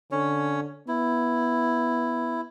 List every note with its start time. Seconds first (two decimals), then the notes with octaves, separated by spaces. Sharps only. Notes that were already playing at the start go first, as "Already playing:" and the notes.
0.11 D3 C#4 C#5
0.88 B3 E4